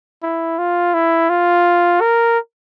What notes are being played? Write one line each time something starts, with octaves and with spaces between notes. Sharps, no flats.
E4
F4
E4
F4
A#4